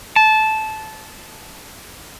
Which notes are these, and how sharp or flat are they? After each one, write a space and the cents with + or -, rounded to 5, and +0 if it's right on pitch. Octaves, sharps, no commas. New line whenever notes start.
A5 -15